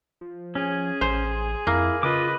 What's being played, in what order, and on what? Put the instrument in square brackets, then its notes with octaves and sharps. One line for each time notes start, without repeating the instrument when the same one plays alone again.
[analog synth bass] F3
[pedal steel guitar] C#4 [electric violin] G#4
[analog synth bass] A1 [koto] C5
[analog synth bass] F2 [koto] A#3 [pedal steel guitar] E4
[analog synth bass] C#3 [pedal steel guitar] F4 D6 [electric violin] B4 D#5